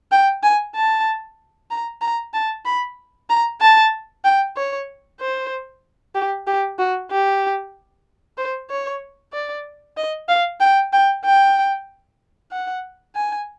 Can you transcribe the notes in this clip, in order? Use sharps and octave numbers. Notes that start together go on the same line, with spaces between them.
G5
G#5
A5
A#5
A#5
A5
B5
A#5
A5
G5
C#5
C5
G4
G4
F#4
G4
C5
C#5
D5
D#5
F5
G5
G5
G5
F#5
G#5